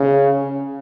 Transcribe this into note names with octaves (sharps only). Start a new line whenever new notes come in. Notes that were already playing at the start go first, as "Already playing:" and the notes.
Already playing: C#3